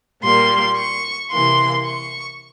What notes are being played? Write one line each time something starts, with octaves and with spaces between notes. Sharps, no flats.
A#2 G3 A#3 C6
C#6
C3 E3 A#3 C6
C#6